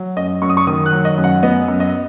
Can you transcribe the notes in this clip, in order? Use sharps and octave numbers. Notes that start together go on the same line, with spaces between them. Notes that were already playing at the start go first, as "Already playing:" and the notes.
Already playing: F#3
F#2 D#5
F#2 C#6
D#6
C#6
D#3 D#6
F#6
F#3
D#5
F#2
F#5
B3 D#5
F#2
D#5